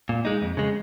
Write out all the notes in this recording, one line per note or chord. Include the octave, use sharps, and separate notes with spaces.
A#2
G#3 D#4
F2
C#3 G#3